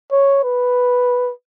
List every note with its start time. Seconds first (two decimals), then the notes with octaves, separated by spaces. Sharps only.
0.12 C#5
0.44 B4